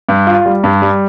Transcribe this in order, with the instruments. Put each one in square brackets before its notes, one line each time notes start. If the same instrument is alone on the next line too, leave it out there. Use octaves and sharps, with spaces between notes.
[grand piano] G2
F4
G3
G2
G3